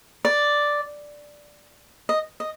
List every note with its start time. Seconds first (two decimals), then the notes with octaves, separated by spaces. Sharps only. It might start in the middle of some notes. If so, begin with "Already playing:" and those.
0.25 D5
2.09 D#5
2.40 D#5